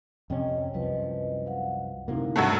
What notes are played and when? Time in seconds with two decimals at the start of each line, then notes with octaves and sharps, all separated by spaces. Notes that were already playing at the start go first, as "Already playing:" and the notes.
0.30 F2 C3 C#4 D#5 G5
0.74 C2 F#2 F3 B4 D#5
1.46 F5 F#5
2.08 D2 C3 A#3 D#4 E4 F#4
2.36 G2 F#3 A3 E6